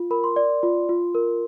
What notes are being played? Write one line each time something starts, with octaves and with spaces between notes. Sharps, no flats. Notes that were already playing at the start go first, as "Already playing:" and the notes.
Already playing: F4
A#4 B5
C6
D5
F4
F4
A#4